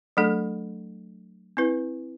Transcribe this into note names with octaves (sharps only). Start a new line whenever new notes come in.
F#3 A3 D4 A4
C4 E4 B4